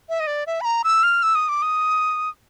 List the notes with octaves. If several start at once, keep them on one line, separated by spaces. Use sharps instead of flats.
E5
D#5
D5
E5
B5
A#5
E6
F6
E6
D#6
D6
D#6